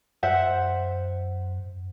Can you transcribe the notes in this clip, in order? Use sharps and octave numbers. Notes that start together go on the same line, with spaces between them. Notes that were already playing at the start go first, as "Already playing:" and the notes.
F#2 C5 E5 F#5